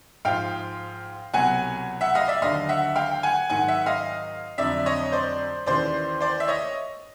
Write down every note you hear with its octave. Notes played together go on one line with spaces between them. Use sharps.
G#2 F3 F5 G5
C2 B2 F#3 F#5 G#5
E5 F#5
D#5 F5
D5 E5
D#2 D3 F#3 D#5 F5
E5 F#5
F5 G5
G5
F#5 G#5
G#2 D#3 F#3 F#5 G#5
E5 F#5
D#5 F5
F2 D3 F#3 D5 E5
C#5 D#5
C5 D5
D#2 C#3 E3 C5 D5
C5 D5
E5
C#5 D#5